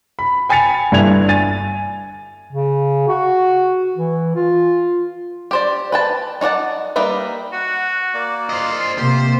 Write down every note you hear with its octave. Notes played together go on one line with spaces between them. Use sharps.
B5
G5 G#5 B5 A6 C#7 F7
G1 G2 D4 E4 G#6 F7
G#5 A6 D#7
C#3
F#4
E3
F4
G4 C5 D5
B4 G5 A5
D#4 C#5 D5 F#5 A5
G3 A#3 D#4 B4 E5
F#4 F#5
A#3 D5
F4 C5 D#5
C3 A#3 G4 C5